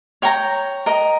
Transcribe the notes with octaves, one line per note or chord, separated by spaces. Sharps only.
C#5 G5 A#5
A#4 D#5 A#5